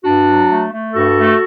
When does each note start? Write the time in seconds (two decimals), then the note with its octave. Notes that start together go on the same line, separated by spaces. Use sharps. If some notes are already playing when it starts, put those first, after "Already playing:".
0.04 G2 D4 F#4
0.27 F#3
0.49 A3
0.71 A3
0.93 G2 F#4 A4
1.16 A3